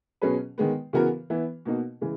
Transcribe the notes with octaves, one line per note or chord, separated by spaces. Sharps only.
B2 F#3 C#4 G#4 B4
D#3 G#3 B3
C#3 E3 B3 F#4 A#4
E3 B3 E4
B2 A#3 D#4 F#4
C#3 E3 G#3